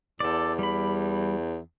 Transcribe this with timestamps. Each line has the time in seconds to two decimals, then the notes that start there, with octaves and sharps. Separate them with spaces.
0.20 E2 A4 D5
0.59 G3 B5